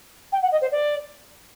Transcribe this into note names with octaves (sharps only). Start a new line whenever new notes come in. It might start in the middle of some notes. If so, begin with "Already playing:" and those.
G5
F#5
D#5
C5
D5